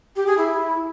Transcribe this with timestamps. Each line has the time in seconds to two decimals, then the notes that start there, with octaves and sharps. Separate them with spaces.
0.16 G4
0.27 G#4
0.38 E4